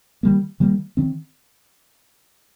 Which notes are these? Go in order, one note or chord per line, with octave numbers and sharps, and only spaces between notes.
D#3 G3 A#3
D#3 G3 A#3
D#3 C4